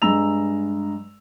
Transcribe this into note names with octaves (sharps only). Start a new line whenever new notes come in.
G2 G#3 A#5 E6 F7